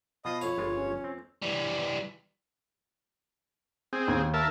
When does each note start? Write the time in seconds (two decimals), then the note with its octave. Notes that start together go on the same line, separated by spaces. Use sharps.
0.25 B2 F4 C5 D#5 B5 D#6
0.41 F2 C#5 F5
0.58 G1 G#3 F4
0.75 C#4
1.04 C4
1.42 E3 G3
3.93 C4 G#4
4.08 D#2
4.34 A#4 E5 A5